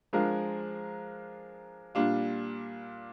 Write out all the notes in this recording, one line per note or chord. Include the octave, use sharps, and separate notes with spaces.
F3 G#3 D4 F4 A#4
A#2 G3 D4 F4